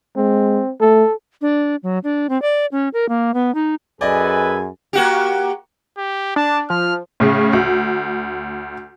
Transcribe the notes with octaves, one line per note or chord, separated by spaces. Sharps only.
G#3 C4
A3 A4
D4
F#3
D4
C4
D5
C#4
A#4
A#3
B3
D#4
F#2 G#4 A4 B4 D5 D#5 G#5
A#3 F#4 G4
G4
D4 A5
F3 F6
A2 C#3
D2